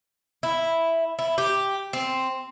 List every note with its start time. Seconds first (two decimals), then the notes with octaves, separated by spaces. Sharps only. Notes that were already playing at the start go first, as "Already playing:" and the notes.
0.43 E4
1.19 E4
1.38 G4
1.93 C4